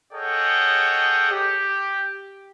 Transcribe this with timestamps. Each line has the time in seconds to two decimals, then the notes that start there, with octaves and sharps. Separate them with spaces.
0.13 G#4 A4 C#5 D#5 F#5 G5
1.31 G4